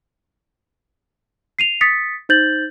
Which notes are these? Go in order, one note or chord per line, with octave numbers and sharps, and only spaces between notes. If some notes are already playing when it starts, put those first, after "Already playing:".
C7 D#7 F7
D#6 A6 B6 C#7
D#4 C5 G6 A6 F#7